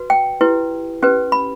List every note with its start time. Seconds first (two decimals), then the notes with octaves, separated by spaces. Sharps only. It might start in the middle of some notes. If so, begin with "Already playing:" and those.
Already playing: F#4 B4
0.10 G5
0.41 E4 G4 B4
1.03 C#4 G4 B4
1.32 B5